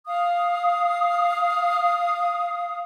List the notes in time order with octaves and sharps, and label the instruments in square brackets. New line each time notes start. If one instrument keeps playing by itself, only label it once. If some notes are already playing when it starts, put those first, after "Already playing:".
[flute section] F5 D#6